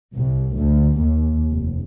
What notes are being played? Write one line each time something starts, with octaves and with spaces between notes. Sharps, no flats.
C2
D2
D#2
F1